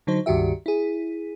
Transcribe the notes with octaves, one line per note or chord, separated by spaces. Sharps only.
D3 F#3 D#4 C5
C#2 G2 D#3 F#4 G4 E5
E4 G#4